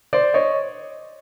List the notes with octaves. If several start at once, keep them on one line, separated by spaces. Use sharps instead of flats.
C5 D5
C#5 D#5